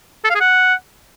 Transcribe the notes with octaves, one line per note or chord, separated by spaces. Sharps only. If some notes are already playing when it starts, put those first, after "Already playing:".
A4
F5
G#4
F#5